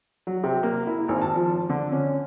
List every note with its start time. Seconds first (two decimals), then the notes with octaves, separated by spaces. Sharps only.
0.27 F#3
0.44 C3
0.63 A#3
0.87 E4
1.08 G#1
1.21 A5
1.35 F3
1.69 D3
1.92 C#4